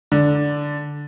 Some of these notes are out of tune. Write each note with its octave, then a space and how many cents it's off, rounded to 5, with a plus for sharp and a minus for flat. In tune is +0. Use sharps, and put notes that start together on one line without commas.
D3 -5